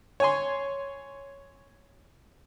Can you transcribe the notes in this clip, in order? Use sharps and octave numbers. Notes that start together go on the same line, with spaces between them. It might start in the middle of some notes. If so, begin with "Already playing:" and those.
C#5 G#5 C6